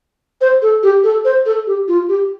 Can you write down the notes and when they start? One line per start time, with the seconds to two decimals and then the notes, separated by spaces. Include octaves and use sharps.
0.41 C5
0.62 A4
0.83 G4
1.03 A4
1.25 C5
1.45 A4
1.67 G4
1.88 F4
2.09 G4